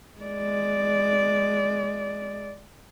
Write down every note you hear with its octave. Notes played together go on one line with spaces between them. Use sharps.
G#3 D5